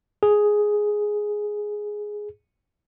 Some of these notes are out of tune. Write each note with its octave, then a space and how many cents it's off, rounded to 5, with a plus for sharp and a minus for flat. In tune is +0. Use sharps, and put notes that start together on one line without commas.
G#4 +5